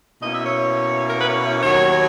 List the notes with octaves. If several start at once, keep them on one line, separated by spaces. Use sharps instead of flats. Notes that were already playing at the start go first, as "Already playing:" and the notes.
B2 A#3 C#4 E4 D#5
E5
C#5
A#4
B4
C#5
D#2 D#3 F#3 C#5